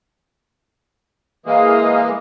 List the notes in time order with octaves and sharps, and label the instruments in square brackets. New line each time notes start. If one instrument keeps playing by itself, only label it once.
[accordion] E3 G#3 A#3 [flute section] F5 D#6